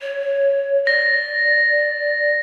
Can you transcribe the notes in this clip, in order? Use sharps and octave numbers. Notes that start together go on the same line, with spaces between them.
C#5
D5 A#6